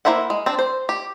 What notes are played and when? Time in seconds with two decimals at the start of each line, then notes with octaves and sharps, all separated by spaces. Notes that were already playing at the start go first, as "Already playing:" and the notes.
0.05 A#3 E4 C5 E5 F#5
0.30 G#3
0.46 C4 D4
0.59 C5
0.89 G4